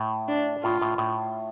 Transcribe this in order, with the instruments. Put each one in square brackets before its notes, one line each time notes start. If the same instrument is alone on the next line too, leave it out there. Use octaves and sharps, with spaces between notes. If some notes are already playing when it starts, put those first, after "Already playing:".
Already playing: [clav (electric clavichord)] A2
[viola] D4
[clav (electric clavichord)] A2 [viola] F4
[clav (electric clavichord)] A2
A2